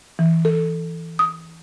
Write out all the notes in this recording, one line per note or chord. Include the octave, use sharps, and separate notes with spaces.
E3
A4
D#6